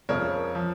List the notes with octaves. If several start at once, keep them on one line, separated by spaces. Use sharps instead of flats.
F2 C#3 F3 A#4 C#5
F3